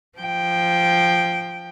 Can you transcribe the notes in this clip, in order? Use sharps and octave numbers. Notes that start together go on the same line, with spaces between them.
F3 G5